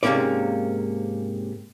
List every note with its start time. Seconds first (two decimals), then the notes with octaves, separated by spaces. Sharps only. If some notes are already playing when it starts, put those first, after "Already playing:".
0.03 G#2 C3 D#3 A#3 C#4 D5